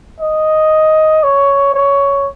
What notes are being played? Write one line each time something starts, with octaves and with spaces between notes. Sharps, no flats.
D#5
C#5
C#5